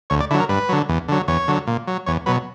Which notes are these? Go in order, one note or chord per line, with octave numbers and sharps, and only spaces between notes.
D2 C#5
D5
D3 F#3 E4
A#4
G2 B4
D3 F#3
E2
D3 F#3
E2 C#5
D3 F#3
A#2
F#3
E2 C#5
B2 F#3 B4